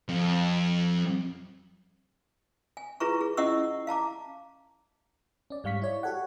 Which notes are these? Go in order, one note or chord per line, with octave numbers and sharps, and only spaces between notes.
F2
G#5
E4 F4 G#4 B4 A#5 C#6
G#4
C#4 E4 D#5 F#5 C#6 E6
F5 A5 A#5 D6
C#4 D5
G#2 G3 F5 C#6 B6
E4 C#5 D5
F#4 G4 A4 C#5 F#5